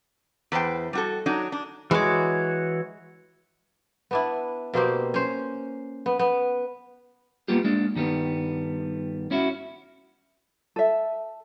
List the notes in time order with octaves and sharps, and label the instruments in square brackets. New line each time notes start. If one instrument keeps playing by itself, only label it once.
[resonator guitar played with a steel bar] E2 B4 C5 G5
G3 F#4 A4
F#3 D4 D#4
D4
[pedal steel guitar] E3 F#4 C#5 [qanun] G#3 D6
[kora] B3 D4 E4
B2 A#3 C4 G4
C#4 C5
B3
B3
[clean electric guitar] G3 A#3 B3 F4 G4
G#3 A#3 D4
G2 D#3 G3 B3
C#4 E4 F#4
[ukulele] A4 E5